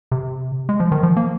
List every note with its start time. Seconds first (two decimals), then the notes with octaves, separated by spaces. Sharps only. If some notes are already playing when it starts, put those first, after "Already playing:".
0.12 C3
0.69 G#3
0.80 F3
0.92 D#3
1.03 F3
1.17 A#3